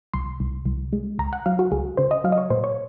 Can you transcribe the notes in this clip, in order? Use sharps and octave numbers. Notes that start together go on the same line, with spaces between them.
C2 C6
C2
C2
G#3
C#2 A#5
F#5
F#3 F5
F#4
C#2 G#4
C#3 C5
D#5
F#3 F5
D#5
C#5
A#2 C5
C#5